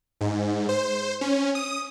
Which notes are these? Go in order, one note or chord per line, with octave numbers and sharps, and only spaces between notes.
G#2
C5
C#4
D#6